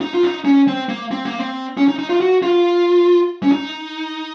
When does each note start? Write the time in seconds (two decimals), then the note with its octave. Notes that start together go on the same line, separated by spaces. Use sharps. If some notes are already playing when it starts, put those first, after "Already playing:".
0.01 D#4
0.13 F4
0.24 D#4
0.45 C#4
0.68 C4
0.89 A#3
1.11 C4
1.25 A#3
1.38 C4
1.77 C#4
1.88 D#4
1.99 D#4
2.09 F4
2.21 F#4
2.43 F4
3.43 C#4
3.52 D#4